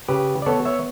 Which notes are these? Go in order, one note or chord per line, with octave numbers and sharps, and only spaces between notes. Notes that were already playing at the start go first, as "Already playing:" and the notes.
C#3 G4 B4
D5
B3 A4 C#5
C#5 E5